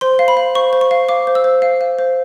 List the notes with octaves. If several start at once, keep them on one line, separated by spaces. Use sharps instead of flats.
C5 C6
F5
B5
F5
C5 C#6
C5
C#6
F5
F5 D6
C5
E6
C5
F5
F5
C5